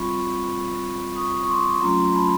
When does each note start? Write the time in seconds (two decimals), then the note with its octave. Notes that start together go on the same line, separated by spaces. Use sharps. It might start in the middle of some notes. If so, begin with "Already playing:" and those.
Already playing: G3 C4 F4 B5 C#6
1.15 C#6 D#6
1.44 C#6
1.48 C6 D6
1.81 F#3 A3 C#4 F4 A#5 C6
2.14 A5 B5